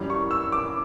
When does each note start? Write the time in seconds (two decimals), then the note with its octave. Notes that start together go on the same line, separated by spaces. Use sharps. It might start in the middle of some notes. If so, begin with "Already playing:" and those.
Already playing: F#2 E3 G3
0.10 C#6
0.31 E6
0.52 D6